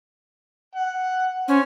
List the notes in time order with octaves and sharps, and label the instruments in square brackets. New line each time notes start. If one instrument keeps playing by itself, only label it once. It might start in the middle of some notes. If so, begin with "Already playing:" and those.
[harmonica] F#5
[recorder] C#4 [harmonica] C5